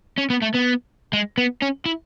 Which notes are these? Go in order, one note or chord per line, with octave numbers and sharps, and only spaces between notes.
C#4
B3
A3
B3
G#3
B3
C#4
E4